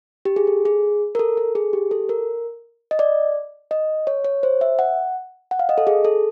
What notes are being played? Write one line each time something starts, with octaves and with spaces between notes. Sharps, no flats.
G4
G#4
A4
G#4
A#4
A4
A4
G#4
G4
A4
A#4
D#5
D5
D#5
C#5
C#5
C5
E5
F#5
F#5
F5
D#5
A4
G#4
A4